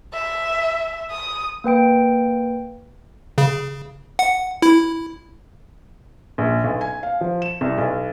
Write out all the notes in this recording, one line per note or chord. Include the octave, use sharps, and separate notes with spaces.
E5
D#6
A#3 B4 G5 D7
C#3
F#5
E4
A#1
B1
G#5
F5
F3
E7
C2
B1